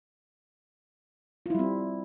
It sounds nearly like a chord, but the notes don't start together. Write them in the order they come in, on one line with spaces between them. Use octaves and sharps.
F4 E4 G3 C4